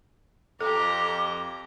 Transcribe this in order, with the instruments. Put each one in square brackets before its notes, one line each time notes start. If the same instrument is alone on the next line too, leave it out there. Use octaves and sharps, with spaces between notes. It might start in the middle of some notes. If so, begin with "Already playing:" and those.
[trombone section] F2 [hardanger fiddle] G4 A#5 [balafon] A4 [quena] D6